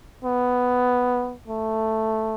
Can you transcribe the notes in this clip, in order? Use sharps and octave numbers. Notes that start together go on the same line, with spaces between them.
B3
A3